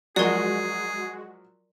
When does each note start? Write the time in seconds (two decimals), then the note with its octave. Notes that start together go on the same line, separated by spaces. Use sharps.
0.16 F3 F#3 G#3 F#4 G#4 A#4 D5